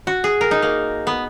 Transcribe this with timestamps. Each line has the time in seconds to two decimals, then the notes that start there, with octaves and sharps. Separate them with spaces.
0.07 F#4
0.24 G#4
0.41 A#4
0.51 D#4
0.62 A#3
1.07 B3